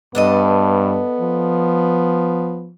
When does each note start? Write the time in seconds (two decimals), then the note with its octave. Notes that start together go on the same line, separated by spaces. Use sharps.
0.15 G2 B3 D4 A4 D#5
1.20 F3